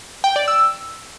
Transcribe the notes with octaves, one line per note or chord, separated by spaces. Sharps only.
G5
D5
E6